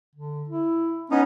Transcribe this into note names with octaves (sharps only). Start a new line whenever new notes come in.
D3
E4
B3 C#4 D#4